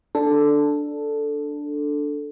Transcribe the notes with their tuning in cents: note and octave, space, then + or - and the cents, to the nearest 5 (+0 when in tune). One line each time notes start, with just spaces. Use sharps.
D4 +0 A4 +0